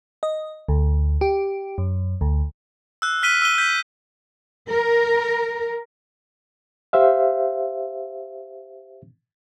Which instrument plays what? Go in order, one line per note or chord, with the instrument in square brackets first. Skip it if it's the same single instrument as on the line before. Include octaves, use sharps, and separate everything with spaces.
[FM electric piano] D#5
D2
G4
F#2
D2
[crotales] E6 F#6
F6 B6 D#7 G7
E6 D#7 G7
G6 B6
[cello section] A#4
[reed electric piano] G4 C5 E5 F5